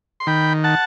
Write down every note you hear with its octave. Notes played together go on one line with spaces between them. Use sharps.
C6
D#3 G5 B5
F#5 A5